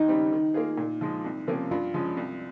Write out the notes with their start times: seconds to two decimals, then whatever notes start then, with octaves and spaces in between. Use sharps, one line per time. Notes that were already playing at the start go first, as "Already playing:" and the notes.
Already playing: D#2 D#4
0.08 C#3 G3 C4
0.32 D#3
0.54 A#3 F4 G#4
0.78 A#2
1.01 F3 G#3
1.24 C2
1.47 C3 F3 A#3 C#4
1.71 G2 F4
1.94 F3 G#3 C#4
2.17 C2